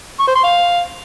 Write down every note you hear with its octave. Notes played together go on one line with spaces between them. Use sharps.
C#6
C5
C6
F5